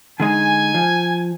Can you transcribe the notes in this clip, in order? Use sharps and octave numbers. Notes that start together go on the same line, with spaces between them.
D3 G#3 D#4 G#5
F3